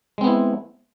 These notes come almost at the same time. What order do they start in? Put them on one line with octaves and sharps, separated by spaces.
G#3 C4 B3 E4